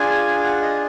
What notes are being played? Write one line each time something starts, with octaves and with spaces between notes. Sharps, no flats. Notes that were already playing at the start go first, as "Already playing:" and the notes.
Already playing: D4 F4 G#4 G#5
F#5
D#5